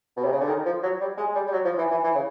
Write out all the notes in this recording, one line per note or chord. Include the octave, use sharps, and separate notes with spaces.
B2
C3
C#3
D3
D#3
F3
F#3
G3
G#3
G3
G3
F#3
F3
E3
E3
E3
C#3